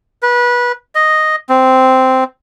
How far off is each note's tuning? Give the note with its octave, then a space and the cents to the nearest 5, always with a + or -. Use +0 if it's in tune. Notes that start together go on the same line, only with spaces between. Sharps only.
B4 -25
D#5 -5
C4 -5